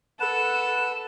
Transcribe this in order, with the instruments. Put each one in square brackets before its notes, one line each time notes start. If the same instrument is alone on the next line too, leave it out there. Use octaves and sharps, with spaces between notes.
[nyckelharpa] A4 [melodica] B4 F#5 [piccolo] E7